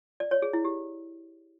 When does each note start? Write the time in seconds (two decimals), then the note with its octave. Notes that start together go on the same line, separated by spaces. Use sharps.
0.20 D5
0.31 C#5
0.42 G#4
0.53 E4
0.65 G4